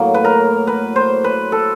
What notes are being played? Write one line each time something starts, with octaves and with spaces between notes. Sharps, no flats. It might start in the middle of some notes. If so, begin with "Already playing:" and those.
Already playing: A2 F#3 A#3
B4
A#4
B4
C5
B4
A4